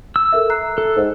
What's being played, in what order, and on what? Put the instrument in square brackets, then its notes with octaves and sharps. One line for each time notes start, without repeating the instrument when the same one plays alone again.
[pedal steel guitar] E6
[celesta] A4 A#4 E5
A#5 F#6 C7
[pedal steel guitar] A4
[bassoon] G#2